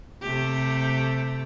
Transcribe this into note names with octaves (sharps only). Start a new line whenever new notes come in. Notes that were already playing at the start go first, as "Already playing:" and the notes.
C3 A3 G4